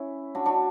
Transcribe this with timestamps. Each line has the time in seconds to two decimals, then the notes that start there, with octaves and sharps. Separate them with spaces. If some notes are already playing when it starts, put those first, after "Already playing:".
Already playing: C#4 E4
0.35 D4 F#4
0.46 D4 F#4